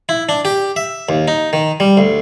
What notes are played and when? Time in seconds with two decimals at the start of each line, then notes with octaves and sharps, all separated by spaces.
0.09 E4
0.29 D4
0.45 G4
0.76 E5
1.09 D#2
1.28 D#4
1.53 D#3
1.80 G3
1.97 D2